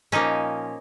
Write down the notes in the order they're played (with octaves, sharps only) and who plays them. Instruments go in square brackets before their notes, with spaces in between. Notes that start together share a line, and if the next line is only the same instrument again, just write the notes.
[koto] A#2 F3 A#3 C#4 D#4